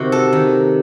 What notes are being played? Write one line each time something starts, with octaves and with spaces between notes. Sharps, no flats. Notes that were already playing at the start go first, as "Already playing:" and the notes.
Already playing: C3 D#3 F#4
A4
D#3